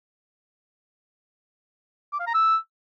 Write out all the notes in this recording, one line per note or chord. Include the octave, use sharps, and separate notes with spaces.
D6
F5
A#5
E6